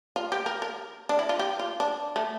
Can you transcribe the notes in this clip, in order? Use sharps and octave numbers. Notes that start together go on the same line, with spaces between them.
F4
G4
A#4
A#4
D4
E4
F4
G4
F4
D4
A3